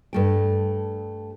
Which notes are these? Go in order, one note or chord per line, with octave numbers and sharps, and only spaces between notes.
G2 A3 G5